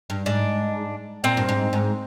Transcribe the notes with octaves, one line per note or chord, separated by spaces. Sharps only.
G2
G#2 D4
A#2 C4
G2
G#2
G#2